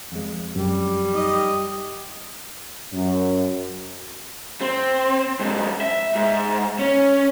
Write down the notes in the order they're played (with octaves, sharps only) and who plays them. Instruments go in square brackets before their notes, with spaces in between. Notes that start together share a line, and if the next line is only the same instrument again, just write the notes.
[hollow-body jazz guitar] F2 G#3
[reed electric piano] F#2 [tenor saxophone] G3
[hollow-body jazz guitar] D#4 [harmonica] D#5
[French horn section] F#2
[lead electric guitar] C4
F2 G#2
E5
G#2
C#4